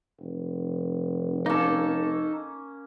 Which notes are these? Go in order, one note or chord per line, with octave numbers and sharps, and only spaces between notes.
F1
A#3 C#4 D#4 A4